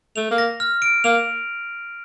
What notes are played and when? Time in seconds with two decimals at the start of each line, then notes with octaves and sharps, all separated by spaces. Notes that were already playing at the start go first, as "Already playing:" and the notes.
0.16 A3 F7
0.31 A#3
0.38 A#6
0.60 F6
0.82 D7
1.04 A#3 F7